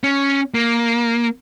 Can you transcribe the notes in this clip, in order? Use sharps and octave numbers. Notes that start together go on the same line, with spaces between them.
C#4
A#3